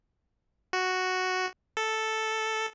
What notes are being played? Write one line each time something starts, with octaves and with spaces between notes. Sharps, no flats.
F#4
A4